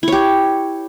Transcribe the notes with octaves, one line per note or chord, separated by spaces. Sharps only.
E4 G4 C#5